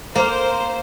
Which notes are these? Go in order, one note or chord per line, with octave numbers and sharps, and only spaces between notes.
A#3 C5